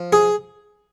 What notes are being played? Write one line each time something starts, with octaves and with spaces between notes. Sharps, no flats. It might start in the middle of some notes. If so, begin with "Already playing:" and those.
Already playing: F3
G#4